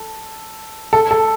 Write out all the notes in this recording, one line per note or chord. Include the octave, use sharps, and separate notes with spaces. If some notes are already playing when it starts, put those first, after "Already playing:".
Already playing: A4
A4
A4